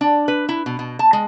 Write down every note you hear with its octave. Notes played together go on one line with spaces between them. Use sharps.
D4
B4
E4
B2
B2
A5
G#3